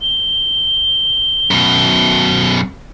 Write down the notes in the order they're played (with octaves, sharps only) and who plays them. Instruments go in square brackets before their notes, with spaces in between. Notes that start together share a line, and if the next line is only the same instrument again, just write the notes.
[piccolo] G7
[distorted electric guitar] F#2 B2